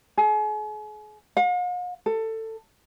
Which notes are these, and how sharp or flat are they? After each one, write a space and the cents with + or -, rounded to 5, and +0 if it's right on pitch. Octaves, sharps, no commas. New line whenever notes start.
G#4 +40
F5 +45
A4 +20